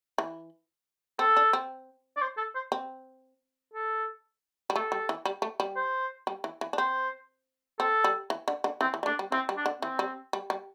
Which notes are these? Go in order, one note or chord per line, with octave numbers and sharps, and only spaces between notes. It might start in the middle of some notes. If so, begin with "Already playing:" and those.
E3
C4 A4
D4
C4
D5
C5
A4
C5
C4
A4
G3
A3 A4
G3
E3
G3
A3
G3
C5
G3
E3
E3
D4
C4 C5
C4 A4
G3
E3
D3
D3
E3 C4
E3
G3
A3 D4
G3
E3 C4
G3
D4
D3
E3 C4
G3
G3
G3